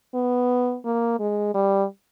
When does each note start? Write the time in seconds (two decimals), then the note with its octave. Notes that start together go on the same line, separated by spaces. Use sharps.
0.15 B3
0.85 A#3
1.20 G#3
1.54 G3